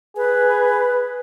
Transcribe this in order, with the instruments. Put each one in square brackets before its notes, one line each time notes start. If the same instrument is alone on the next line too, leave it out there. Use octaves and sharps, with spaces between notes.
[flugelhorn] G#4 [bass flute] B4